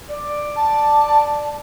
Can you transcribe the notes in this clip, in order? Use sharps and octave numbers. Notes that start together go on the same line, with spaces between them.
D5
A5